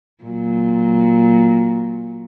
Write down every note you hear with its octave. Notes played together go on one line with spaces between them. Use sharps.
A#2 F#3